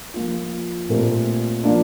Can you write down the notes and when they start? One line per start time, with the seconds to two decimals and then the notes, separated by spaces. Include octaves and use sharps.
0.14 F3 A#3 F4
0.89 A#2 A3 C4 G4 A#4
1.63 F3 A#3 D4